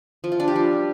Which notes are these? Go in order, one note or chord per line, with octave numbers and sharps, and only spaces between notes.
F3
F4
D4
G4
G3